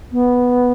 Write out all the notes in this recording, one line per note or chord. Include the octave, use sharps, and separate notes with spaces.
B3